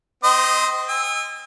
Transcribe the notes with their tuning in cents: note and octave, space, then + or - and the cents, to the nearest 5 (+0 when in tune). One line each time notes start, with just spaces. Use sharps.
C4 -30 C5 +0 D#5 +0
G#5 -40 E6 +0